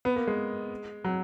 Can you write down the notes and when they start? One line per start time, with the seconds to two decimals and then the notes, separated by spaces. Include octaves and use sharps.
0.05 B3
0.16 A#3
0.27 G#3
1.04 F#3